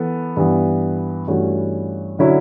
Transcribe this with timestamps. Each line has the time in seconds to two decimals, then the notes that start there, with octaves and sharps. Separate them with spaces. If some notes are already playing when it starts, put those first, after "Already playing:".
Already playing: E3 B3 A4
0.37 G2 E3 B3
1.28 G2 E3 A3 C#4 F#4
2.19 D3 F#3 C#4 E4